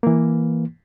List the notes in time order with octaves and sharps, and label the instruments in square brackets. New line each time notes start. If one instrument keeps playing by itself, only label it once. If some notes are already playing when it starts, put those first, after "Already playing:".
[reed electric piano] E3 A#3